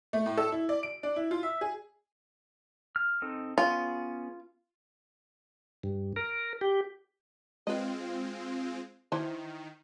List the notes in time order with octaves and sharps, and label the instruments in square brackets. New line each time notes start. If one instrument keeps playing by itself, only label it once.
[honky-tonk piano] A3
A2
A4
E4
D5
D7
D4
E4
F4
E5
G#4
[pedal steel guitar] F6
C4 D#4 A4
[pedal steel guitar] B3 C#4 G#4 [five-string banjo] F4
[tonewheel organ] G2
A#4
G4
[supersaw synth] G#3 C4 F4 [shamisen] B4 D#5
[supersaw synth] D#3 [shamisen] E3 E4 C5